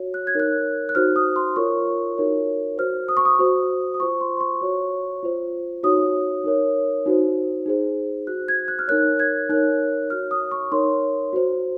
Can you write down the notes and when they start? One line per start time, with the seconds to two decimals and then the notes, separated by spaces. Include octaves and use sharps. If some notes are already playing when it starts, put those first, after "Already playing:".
Already playing: F#4 C#5
0.14 F#6
0.27 G#6
0.35 D#4 A#4 C#5 F#6
0.89 F#6
0.95 D#4 F#4 C5 F6
1.16 D#6
1.36 C6
1.56 F4 A#4 C#5 C#6
2.18 D#4 F#4 A#4 C#5
2.78 F#4 C5 F6
3.08 D#6
3.17 C#6
3.25 D#6
3.39 F#4 C5
3.94 D#6
4.00 F4 C5 C#6
4.21 C6
4.37 C6
4.40 C#6
4.61 F#4 C#5
5.23 F4 C5
5.83 D#4 F#4 C#5 D#6
6.44 D#4 A#4 C#5
7.06 D#4 F#4 C5
7.66 D#4 G#4 C5
8.27 F#4 C5 F#6
8.48 G#6
8.68 F#6
8.79 F6
8.88 D#4 A#4 C#5 F#6
9.20 G#6
9.49 D#4 A#4 C#5 F#6
10.10 F#4 C#5 F6
10.31 D#6
10.51 C#6
10.72 D#4 A#4 C#5 C6
11.33 F#4 C5